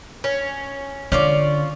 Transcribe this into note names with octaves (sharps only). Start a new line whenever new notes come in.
C#4
D3 C#4 F4 D5